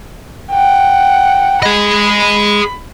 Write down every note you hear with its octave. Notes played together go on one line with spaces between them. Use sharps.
F#5 G5
G#4 D#5 B5